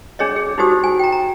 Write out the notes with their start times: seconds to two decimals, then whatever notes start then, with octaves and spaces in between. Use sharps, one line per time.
0.19 D4 G#4 C#5 D#5
0.36 G#4
0.58 D#4 E4 F#4 G4 C5 D#6
0.84 G#5
0.99 G5 A#5
1.12 A#5